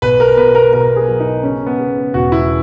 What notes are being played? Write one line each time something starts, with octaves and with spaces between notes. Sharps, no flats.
B1 B4
A#4
B2 B4
A#4
B2 A#4
G#4
F#3
D#4
C#3 C#4
B3
C#3
E1 F#4
E4